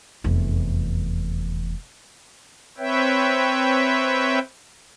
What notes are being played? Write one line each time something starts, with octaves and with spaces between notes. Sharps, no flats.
F1 E2
C4 B4 C#5 E5 G5